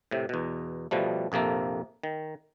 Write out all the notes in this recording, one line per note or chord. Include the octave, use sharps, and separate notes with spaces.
A2 C3
E2 B2
B2 F3 G3 A3
A#1 F2 C3 A#3 A4
D#3